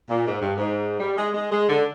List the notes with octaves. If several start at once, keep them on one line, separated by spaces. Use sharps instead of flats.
A#2
G#2
G2
G#2
G3
G#3
G#3
G#3
D3